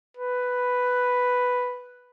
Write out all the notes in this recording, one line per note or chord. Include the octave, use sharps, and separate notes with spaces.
B4